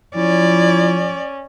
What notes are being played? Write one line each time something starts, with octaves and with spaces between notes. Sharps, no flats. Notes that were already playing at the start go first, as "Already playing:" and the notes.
F3 C#4 E4 D5